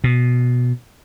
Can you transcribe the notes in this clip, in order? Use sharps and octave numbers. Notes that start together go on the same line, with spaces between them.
B2